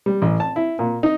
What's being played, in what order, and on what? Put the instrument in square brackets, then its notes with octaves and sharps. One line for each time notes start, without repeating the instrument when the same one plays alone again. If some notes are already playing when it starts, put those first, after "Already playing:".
[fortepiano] G3
A1
A5
E4
A#2
D#4